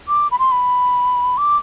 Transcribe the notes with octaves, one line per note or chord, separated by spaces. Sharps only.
D6
B5
C6
B5
D6